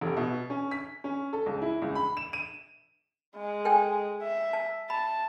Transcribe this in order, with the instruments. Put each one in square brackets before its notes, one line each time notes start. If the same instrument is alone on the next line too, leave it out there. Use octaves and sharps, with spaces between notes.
[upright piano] F1
B2
C#4
B6
C#4
A4
C#2
E4
C#2
B5
E7
D#7
[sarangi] G#3
[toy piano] A4 G5 G#5
[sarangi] E5
[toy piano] A5
[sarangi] A5 [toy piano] B5